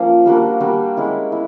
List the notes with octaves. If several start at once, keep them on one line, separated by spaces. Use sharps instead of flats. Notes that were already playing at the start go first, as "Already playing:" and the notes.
Already playing: F3 A#3 C#4 F4
G3 A#3 D4 F#4
G3 A#3 D4 F#4
G#3 C#4 E4
E4